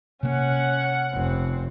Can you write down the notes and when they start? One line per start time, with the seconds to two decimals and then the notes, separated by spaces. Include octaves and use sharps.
0.23 C3 A#3 C#4 F#5
1.14 F1 C4